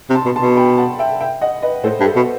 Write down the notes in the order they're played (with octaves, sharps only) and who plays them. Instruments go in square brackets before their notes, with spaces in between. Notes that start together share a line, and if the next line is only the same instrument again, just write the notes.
[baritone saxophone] C3
[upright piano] A5 C6
[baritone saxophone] B2
[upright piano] A5 C6
[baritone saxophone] B2
[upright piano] G5 B5
F#5 A5
E5 G5
E5 G5
D#5 F#5
B4 D#5
[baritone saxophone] A2 [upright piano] A4 C5
[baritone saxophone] G2
[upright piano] A4
[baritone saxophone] B2